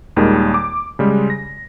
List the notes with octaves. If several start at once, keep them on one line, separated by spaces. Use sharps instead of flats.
D#2 A#2 D#3 G3 G#3
D6
C#3 G3 G#3
A#6